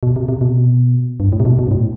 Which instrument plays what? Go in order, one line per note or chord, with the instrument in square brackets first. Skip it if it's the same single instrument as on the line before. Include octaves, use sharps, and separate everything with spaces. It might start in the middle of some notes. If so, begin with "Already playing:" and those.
[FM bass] B2
C3
C3
B2
G2
A2
C3
B2
B2
G2
A2